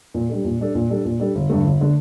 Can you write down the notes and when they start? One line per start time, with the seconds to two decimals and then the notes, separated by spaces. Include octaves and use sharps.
0.14 A#2
0.29 G3 D4 A4
0.45 A#2
0.59 G3 D4 A4
0.75 A#2
0.90 G3 D4 A4
1.05 A#2
1.20 G3 D4 A4
1.35 G1
1.50 G2 D3 A3
1.65 G1
1.81 D3 A3